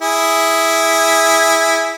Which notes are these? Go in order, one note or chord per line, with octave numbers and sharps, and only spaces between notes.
E4 G#4